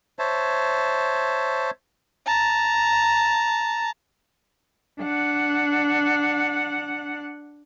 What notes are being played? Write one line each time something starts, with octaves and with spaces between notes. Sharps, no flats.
C5 C#5 E5 A5
A5 A#5
D4 F#5